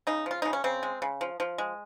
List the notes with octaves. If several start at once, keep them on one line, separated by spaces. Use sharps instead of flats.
C#3 D#4
F3 F4
C#3 D#4
C#4
C#3 C4
G#3
C#3
F3
F3
G#3